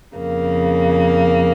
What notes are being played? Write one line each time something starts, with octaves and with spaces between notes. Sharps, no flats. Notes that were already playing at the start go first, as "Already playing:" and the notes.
F2 C#3 A#3